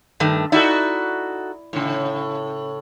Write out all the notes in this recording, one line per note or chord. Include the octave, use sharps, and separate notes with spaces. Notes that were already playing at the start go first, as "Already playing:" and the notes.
G2 D#3 A3
D#4 E4 F#4 A4 D5 E5
A2 C#3